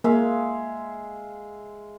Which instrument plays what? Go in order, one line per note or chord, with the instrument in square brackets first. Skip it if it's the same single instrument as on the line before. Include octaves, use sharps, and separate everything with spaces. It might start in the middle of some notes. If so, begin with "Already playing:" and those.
[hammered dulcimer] G#3 E5 F5 [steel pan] A#3